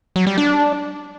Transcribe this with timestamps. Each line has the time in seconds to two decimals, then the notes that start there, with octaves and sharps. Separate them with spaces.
0.16 F#3
0.27 G3
0.38 D4